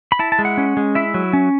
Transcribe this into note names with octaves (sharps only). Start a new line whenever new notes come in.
B5
E4 A5
A5
G#3
F#5
C#4
G#3
E4 E5
F#3
C#4